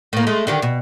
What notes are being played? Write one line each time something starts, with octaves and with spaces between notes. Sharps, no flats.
A2 A#3
G#3 A3
D3 D#3 G4
B2